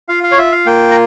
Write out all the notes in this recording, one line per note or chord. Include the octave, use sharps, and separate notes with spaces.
F4 F5
F5
C#5
F4 E5
F5
A#3 G5
A#5